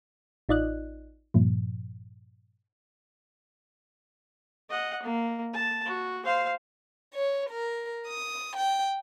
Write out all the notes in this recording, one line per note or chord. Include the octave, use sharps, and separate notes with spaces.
A1 D#4 F4 D5 D#5 F#6
G2 A#2 F3
D#5 F#5
A#3
A5
F#4
C5 F5
C#5
A#4
D#6
G5